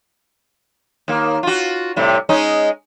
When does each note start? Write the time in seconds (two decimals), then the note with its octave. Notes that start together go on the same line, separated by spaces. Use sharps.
1.08 D#2 A#3
1.43 F4 F#4
1.96 A2 C3 G3
2.29 G#3 C#4 D#4